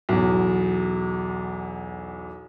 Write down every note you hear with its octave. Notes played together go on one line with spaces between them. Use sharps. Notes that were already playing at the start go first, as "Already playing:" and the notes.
B1 E2